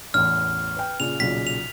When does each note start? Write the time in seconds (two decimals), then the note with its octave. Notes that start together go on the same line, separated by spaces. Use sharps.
0.14 A1 E2 F6
0.77 B4 G5
1.00 A#2 C#3 F7
1.20 B1 A#2 C#3 B6
1.47 F7